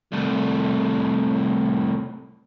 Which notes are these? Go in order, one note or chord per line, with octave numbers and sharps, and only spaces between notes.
C2 A2